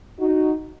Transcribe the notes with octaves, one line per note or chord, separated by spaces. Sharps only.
D#4 F#4